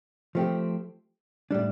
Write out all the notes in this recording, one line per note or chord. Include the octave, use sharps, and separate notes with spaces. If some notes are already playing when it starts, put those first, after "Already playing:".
F3 A3 C4 G4
A2 G3 D4